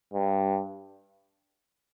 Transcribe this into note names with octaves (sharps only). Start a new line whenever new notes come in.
G2